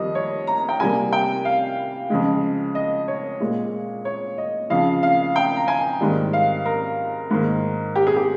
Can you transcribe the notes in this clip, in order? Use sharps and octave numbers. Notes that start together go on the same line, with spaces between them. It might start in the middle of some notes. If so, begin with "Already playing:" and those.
Already playing: F2 D#3 G3 A#3 D#5
C#5
A#5
G5
C3 G3 A#3 G#5
G5
F5
F2 C#3 G#3
D#5
C#5
A#2 G#3
C#5
D#5
F2 C#3 F3 F5
F5
G5
A#5
G#5
G#2 D#3 G3 A#3
F5
A#4
G#2 D#3 A#3
G4
G#4
G4